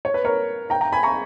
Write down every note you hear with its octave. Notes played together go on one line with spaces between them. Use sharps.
C#5
B4
A#4 C#5
G5 A#5
G5 A#5
G#5 B5
A#5 C#6